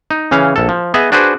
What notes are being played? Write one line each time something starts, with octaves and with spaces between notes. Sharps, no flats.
D#4
C#3 E3 C#4 F5
A#1 A4
F3
B3 G#4 D#5 E5
D4 F#4 G#4 B4 C5